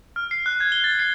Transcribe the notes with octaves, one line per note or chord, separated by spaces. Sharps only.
F6
C7
F#6
G#6
G7
A6
C7